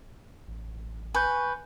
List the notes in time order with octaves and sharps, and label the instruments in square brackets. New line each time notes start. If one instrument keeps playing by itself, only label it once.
[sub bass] A1
[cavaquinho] B4 [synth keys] G#5 C#6 G6